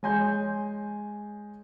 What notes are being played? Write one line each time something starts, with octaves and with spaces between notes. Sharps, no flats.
G#3 C#5 G#5 C6 G6